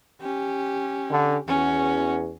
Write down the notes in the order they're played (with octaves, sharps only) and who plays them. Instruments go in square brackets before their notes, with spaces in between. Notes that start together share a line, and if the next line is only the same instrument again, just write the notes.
[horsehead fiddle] C#4 G4
[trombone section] D3
[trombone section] E2 [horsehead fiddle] C#4 F#4